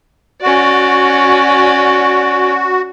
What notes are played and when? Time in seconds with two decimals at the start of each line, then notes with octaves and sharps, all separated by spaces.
0.42 C#4 F#4 D5